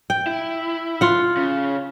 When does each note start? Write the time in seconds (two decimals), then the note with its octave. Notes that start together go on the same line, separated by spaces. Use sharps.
0.10 G5
0.27 E4
1.01 F4 F#5
1.37 C#3